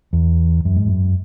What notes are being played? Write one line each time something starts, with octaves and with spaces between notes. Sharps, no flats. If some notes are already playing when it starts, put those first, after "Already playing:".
E2
F#2
G#2
F#2